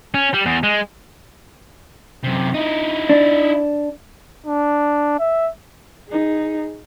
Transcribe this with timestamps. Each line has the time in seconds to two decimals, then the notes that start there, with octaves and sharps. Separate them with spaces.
0.14 C#4
0.34 G3
0.46 E2
0.63 G#3
2.23 F#2 C3
2.54 D#4 E4
3.09 D4
4.46 D4
5.19 E5
6.09 D#4 G#4